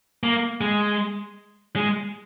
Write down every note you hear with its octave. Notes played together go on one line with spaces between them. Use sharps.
A#3
G#3
G#3